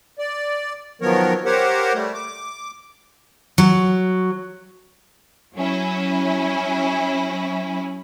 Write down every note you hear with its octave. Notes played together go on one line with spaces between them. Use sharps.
D5
D#3 F3 F#3 B3 A#4 C#5
G4 A#4 C5 C#5 F#5
G3 A3
D6
F#3
F#3 C#4 E4